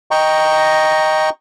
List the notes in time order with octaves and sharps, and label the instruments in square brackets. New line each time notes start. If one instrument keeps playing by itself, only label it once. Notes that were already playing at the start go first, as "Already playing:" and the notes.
[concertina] D#5 G5 A#5 C#6